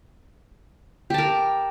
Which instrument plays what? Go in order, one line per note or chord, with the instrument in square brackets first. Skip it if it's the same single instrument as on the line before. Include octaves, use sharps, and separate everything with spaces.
[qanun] G4
A5
A#4